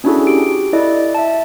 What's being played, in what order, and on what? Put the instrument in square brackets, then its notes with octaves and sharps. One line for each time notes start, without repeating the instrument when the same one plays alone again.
[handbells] C#4 D4 E4 F#4 G#4 A4
G4 D7
E4 A4 D5 D#5
E5 A5